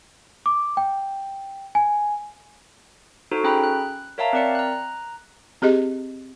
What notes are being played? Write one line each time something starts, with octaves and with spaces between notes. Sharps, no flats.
D6
G5
G#5
D#4 F#4 A4 C5
C#4 G#4 G5 A#5 B5
F#6
A#4 C#5 E5 F5 A5 A#5
C4 A#4 D5 C#7
A#5 F#6
C4 G4 G#4 D#5